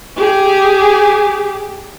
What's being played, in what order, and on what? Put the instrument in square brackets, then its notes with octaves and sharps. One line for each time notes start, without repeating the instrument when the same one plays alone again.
[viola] G4 G#4